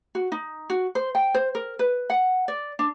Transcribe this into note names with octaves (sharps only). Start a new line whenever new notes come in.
F#4
D#4
F#4
C5
G5
C5
A#4
B4
F#5
D5
D4